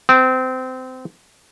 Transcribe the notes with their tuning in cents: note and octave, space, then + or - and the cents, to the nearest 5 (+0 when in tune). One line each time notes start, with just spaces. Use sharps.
C4 -25